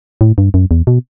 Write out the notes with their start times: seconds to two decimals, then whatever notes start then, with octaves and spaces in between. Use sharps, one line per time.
0.21 A2
0.38 G2
0.54 F#2
0.71 E2
0.87 B2